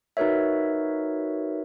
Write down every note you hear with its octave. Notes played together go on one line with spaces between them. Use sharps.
D#4 F#4 A#4 B4 C#5 E5